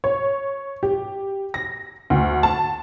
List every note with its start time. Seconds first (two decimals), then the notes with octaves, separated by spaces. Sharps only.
0.04 C#5
0.83 G4
1.54 A#6
2.10 D2
2.43 A5